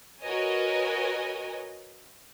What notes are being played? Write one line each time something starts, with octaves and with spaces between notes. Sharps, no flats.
F#4 A#4 B4 C#5 D#5 G#5